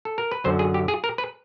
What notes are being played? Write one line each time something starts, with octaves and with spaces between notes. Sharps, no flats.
A4
A#4
B4
F#2 D3 F#3 C5
G#4
G4
G#4
A#4
B4